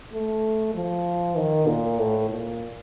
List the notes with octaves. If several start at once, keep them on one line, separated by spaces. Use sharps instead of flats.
A3
F3
D#3
A#2
A2
A#2